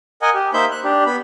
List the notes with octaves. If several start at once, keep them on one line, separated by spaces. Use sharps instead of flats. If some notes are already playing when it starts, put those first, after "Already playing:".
A#4 D#5 F#5 G#5
G4
A#3 D#4 C5 E5 B5 G6
F#6
D4 G4
B3 B5